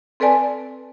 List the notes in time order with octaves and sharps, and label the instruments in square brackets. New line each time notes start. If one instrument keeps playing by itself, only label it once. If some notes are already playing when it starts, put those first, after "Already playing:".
[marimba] C4 A4 B4 D5 G#5 A5